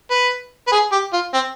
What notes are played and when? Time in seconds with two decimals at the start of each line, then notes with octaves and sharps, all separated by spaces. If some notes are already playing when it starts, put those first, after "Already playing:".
0.10 B4
0.67 B4
0.72 G#4
0.92 G4
1.13 F4
1.34 C4